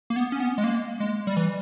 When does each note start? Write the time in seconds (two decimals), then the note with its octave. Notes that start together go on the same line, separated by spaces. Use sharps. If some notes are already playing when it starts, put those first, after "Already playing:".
0.10 A#3
0.16 B3
0.32 C#4
0.40 B3
0.58 G#3
0.64 A#3
1.00 G#3
1.27 G3
1.37 E3